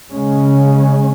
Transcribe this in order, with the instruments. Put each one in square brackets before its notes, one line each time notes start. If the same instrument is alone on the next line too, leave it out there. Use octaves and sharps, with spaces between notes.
[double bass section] C#3 G#3 C#4